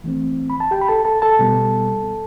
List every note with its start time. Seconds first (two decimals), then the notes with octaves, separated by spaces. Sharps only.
0.04 E3 A3 C4
0.50 B5
0.60 A5
0.71 G4 G5
0.81 B5
0.88 A4 A5
1.05 A4 A5
1.22 A4 A5
1.39 B2 G3 B3